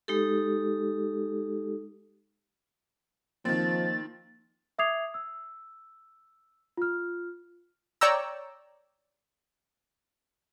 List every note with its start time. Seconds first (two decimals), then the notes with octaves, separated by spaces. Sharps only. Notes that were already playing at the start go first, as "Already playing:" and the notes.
0.08 G#3 D#4 G4 A4
3.45 D#3 F3 A#3 C4 A6
4.78 E5 D6 D#6 G#6 C7 F7
5.14 E6
6.77 F4 F6
8.01 C#5 D5 G5 A#5 E6